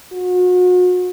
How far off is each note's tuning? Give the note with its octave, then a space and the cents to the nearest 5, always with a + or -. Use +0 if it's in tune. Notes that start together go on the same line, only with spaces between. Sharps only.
F#4 -35